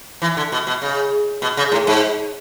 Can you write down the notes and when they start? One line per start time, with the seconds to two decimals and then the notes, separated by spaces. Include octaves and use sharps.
0.22 E3
0.37 D3
0.52 B2
0.67 B2
0.82 C#3
1.42 B2
1.57 C#3
1.72 A2
1.87 G#2